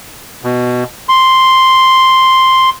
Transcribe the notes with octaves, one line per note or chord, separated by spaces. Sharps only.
B2
C6